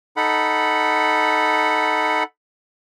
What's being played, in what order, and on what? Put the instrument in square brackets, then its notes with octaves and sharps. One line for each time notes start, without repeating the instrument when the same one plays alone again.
[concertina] D#4 A4 F#5 B5